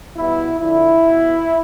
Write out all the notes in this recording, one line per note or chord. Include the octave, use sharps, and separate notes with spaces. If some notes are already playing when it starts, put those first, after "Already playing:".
E2 B2 G3 B3 E4
F2 D3 F3 E4
B2 B3